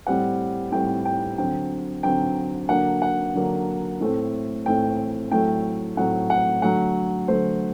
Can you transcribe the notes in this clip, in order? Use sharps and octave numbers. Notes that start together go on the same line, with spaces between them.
A2 G3 C4 F#5
A2 G3 C4 G5
G5
D3 F#3 C4 G5
D3 F#3 C4 G5
D3 F#3 A#3 D4 F#5
F#5
D3 F#3 A#3 D4
A2 A3 C4
A2 A3 C4 G5
A2 F#3 A3 C4 G5
A2 F#3 A3 C4 F#5
F#5
D3 F#3 A3 F#5
D3 F#3 A3 C5